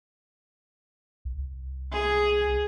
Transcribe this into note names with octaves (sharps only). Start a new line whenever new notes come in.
C2
G#4